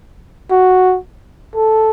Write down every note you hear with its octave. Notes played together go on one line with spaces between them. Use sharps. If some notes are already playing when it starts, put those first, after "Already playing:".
F#4
A4